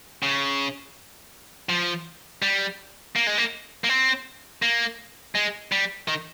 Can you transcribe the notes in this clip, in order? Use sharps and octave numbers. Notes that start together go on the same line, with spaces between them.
C#3
F3
G3
A#3
G#3
A#3
A#3
C4
A#3
G#3
G3
D#3